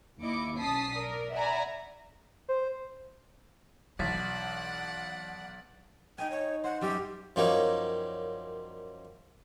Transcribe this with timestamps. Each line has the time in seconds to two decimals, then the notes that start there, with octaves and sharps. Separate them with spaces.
0.22 D#2 E4 D#5 D6 C#7
0.57 B1 C#4 A5 D#6 B6 C7
0.96 A#4 D5
1.34 D5 E5 F#5 G#5 A#5 B5
2.49 C5
3.99 B1 E3 D5 F#5 A6 B6
6.18 D#4 D#5 G5 G#5
6.30 C#5
6.64 C5 F#5
6.81 F#2 G3 G4
7.36 F#2 F3 G3 A#3 D#4 C#5